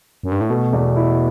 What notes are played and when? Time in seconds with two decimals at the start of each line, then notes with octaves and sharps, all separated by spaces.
0.23 F#2
0.32 G2
0.41 A2
0.50 B2 A3
0.73 E2
0.96 E4